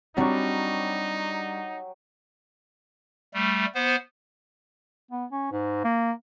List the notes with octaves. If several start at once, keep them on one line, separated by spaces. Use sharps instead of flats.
F#3 G3 C4 D4 D#4 F4 G4 C#6
G3 A3
B3 C5
B3
C#4
G#2
A#3